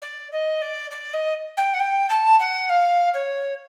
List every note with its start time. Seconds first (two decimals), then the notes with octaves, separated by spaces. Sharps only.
0.02 D5
0.32 D#5
0.62 D5
0.91 D5
1.13 D#5
1.57 G5
1.74 F#5
1.80 G5
2.09 A5
2.40 F#5
2.69 F5
3.14 C#5